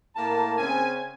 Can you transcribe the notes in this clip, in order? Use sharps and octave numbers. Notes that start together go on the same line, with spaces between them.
A2 A#3 A#4 A5
C#3 C4 C#4 G#5